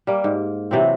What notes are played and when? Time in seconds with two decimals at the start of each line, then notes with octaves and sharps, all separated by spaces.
0.07 G3 A#3
0.24 G#2
0.71 C3 E3 F#3 C4